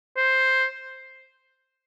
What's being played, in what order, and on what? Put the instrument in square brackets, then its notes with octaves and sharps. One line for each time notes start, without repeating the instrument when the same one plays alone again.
[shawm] C5